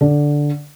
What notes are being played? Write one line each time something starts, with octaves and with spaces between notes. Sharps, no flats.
D3